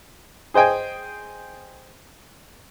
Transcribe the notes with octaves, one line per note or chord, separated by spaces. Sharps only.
G#4 C5 D#5 G5 G#5